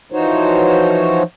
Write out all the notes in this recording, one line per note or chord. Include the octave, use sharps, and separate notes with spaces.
E3 F3 D#4 F#4 C5 C#5